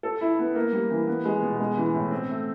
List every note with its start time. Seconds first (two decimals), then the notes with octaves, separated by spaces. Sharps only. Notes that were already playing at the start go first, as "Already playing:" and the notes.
0.03 A4
0.21 E4
0.39 B3
0.55 A#3
0.73 G3
0.90 E3
1.07 B3
1.25 G#3
1.42 B2
1.60 G#3
1.77 E3
1.94 A2
2.11 C4
2.29 A3